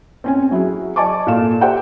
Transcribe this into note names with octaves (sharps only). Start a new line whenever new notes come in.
C4 C#4 G#5
F#3 E4 F#4 G#4
D5 D#5 G#5 A5 C#6 D6
A#2 A4 F5 E7
G4 C5 D5 E5 F#5 G5